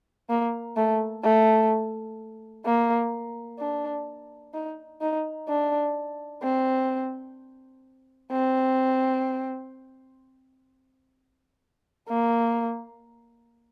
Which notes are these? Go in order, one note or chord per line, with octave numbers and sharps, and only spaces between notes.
A#3
A3
A3
A#3
D4
D#4
D#4
D4
C4
C4
A#3